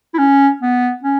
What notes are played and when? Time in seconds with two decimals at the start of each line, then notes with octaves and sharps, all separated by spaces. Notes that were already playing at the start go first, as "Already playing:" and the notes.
0.14 E4
0.18 C#4
0.61 B3
1.04 C#4